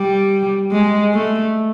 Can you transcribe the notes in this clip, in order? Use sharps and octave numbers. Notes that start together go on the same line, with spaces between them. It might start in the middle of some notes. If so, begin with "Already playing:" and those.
Already playing: G3
G#3
A3